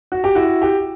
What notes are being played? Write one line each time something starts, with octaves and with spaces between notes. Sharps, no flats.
F#4
G4
E4 F#4
G4